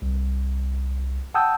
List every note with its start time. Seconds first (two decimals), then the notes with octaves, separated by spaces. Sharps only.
0.02 C2
1.34 F#5 G5 A5 D#6 E6 G6